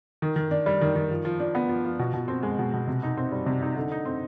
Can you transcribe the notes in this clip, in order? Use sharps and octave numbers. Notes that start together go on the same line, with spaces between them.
D#3
D#3
D4
G3
D#3
D#3
F3
F3
D4
B3
F3
F3
B2
B2
C4
G#3
B2
B2
C3
D#4
C4
G3
C3
D#4
D3
D#4
C4